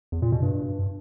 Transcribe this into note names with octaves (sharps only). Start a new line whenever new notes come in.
E2
A#2
B2
G2